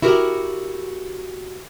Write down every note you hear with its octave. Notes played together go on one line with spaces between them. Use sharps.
E4 F#4 G4 A#4